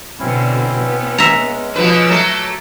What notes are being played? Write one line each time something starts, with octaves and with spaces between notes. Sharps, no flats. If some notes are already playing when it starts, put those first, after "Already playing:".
B2 D3 C4 C#4 E4
B3
G#3 C#4 E5 A#5
B2 F3 B4 D6 E6
F#3 A3